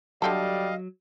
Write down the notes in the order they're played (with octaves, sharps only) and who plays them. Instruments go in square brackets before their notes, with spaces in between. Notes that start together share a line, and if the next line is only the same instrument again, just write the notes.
[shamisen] D3 G4 A4 [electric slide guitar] F#3 [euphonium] G3 [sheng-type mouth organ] D#5 F5